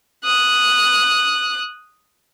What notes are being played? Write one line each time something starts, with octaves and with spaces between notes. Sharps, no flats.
D#6 F#6